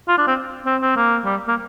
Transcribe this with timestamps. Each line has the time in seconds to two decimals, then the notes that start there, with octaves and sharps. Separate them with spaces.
0.08 F4
0.18 D4
0.27 C4
0.66 C4
0.81 C4
0.96 A#3
1.25 G3
1.48 A#3